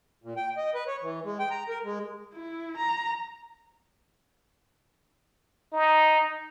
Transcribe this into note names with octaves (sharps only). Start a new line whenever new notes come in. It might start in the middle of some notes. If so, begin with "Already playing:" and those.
A#2
G5
D#5
B4
C#5
E3
G#3
G5
A#5
A#4
G#3
E4
A#5
D#4